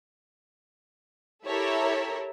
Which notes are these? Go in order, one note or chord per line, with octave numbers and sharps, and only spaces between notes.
E4 G4 A4 A#4 C#5 E5